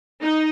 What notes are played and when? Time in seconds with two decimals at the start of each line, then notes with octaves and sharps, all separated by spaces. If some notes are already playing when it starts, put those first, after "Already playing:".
0.22 D#4